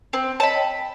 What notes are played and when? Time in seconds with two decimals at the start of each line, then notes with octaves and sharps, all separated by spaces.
0.13 C4
0.40 C#5 D#5 A5 B5
0.55 G5